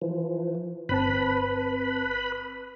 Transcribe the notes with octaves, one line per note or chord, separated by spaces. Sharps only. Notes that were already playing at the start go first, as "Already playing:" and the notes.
E3 F3
G1 C4 B4 A5 B5